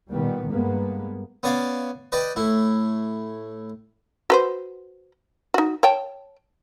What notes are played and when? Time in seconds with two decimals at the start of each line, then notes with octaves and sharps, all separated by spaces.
0.10 A#2 D#3 G3 B3
0.49 G2 G#3 A#3 B3
1.43 B3 C#4 D5 F5
2.12 B4 D5 D#5 G5
2.36 A2 E4
4.30 F#4 B4 C5
5.54 D#4 F#4
5.83 C#5 G5 A5